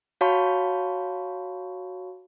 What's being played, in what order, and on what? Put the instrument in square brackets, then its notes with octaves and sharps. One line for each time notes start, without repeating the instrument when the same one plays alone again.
[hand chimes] F#4 C#5 F5 A5 B5 C#6